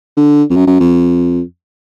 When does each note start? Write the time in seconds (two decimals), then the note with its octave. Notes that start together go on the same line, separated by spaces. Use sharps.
0.16 D3
0.49 F2
0.55 F#2
0.67 F#2
0.80 F2